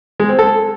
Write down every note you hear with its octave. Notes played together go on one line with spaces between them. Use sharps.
G#3
C4
A4